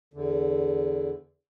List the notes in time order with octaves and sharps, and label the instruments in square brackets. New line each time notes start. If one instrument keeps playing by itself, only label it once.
[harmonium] E2 D3